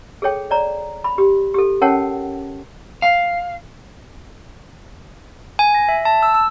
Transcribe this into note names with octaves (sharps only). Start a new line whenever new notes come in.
G#4 A4 C#5 G5
C#5 D5 A#5
B5
G4
G4 A4
C#4 A#4 C#5 F#5 G5 A5
F5
G#5
A#6
E5
A5
E6
E6